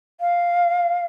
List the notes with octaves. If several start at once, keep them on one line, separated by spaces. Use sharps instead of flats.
F5